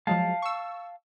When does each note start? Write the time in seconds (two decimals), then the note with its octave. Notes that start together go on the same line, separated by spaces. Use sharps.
0.07 F3 F#3 G#3 F5 A5
0.42 C#6 E6